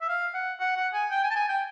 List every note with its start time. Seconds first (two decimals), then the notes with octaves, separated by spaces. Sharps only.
0.01 E5
0.09 F5
0.34 F#5
0.60 F#5
0.77 F#5
0.93 G#5
1.11 G5
1.23 G#5
1.31 A5
1.36 G#5
1.49 G5